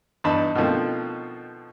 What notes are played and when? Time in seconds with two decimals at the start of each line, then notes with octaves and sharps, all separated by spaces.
0.24 E2 G2 D#4 A5 B5
0.55 B2 D3 D#3 F3 A3 C4